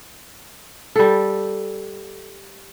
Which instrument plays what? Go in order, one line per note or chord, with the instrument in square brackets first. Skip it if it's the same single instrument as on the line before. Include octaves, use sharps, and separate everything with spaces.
[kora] G3 A4